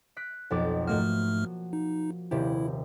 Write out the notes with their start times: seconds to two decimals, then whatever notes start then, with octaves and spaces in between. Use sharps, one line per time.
0.16 F#6 B6 D7
0.50 B1 F2 D6
0.87 G#2 F3 A3 A#3 F#4 F6
1.73 D#4
2.31 D#1 C3 E4 G4